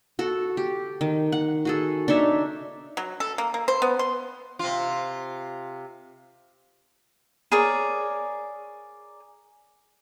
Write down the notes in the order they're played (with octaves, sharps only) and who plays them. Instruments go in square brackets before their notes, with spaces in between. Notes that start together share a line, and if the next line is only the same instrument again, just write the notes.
[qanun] F#4 A4
G4
D#3
F#5
F#4 G#4 A4
D4 D#4 C#5 E5
[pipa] F#3
A4
A#3
A#3
C5
B3
C6
[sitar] C3 F4
[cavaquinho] G#4 A#4 C#5 D5